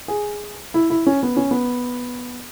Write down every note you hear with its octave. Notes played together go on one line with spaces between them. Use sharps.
G#4
E4
E4
C#4
B3
C#4
B3